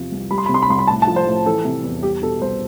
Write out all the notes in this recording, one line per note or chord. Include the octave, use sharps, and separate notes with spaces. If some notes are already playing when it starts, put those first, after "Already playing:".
Already playing: E2 C3 F3
C2
G3 B5
C6
B5
C3
C6
B5
C2 C6
B5
A2 A5
A5
F3
C5
A2
E3 A4
C3
E2
G3 G4
B2 A4
C2 C5